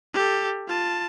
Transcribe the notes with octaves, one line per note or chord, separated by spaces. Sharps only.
G4 A4
F4 A5